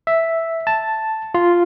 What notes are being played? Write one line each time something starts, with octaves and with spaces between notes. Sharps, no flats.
E5
A5
F4